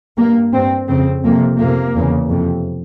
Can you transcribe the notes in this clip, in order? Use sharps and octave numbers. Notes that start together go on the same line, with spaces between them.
G2 A#3
G2 C4
F2 C#3 C4
F2 C3 A#3
F2 C3 A#3
E2 C#3
F2 C3